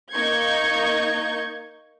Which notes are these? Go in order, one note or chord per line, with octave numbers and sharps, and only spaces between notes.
A#3 D#4 C#6 G6 G#6